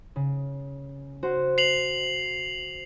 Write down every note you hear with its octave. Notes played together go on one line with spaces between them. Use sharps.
C#3
F#4 C5
C7 F7 F#7